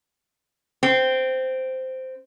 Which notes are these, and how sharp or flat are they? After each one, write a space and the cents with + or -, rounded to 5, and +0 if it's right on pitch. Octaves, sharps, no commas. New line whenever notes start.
C4 -10